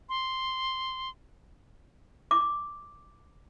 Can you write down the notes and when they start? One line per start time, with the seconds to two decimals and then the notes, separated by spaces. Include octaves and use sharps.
0.09 C6
2.31 D6